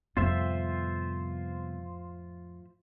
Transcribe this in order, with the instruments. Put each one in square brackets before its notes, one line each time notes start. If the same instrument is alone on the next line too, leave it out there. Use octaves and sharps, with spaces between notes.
[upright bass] F2 A2 [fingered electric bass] C3 G3 B3 [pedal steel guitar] F4 C5 E5